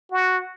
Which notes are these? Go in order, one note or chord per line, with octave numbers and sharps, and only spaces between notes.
F#4